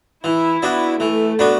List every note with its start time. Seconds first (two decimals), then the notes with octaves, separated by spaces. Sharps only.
0.24 E3 E4
0.63 B3 D4 F#4
1.00 E3 A3
1.39 B3 D4 F#4